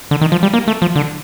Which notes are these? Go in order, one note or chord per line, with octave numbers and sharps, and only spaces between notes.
D3
D#3
F3
G3
A#3
A3
F3
D3